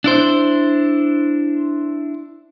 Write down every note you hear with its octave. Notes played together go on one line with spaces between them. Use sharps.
D4 E4 C5